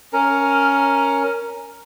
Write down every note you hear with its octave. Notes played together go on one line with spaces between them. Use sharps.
C#4 A#4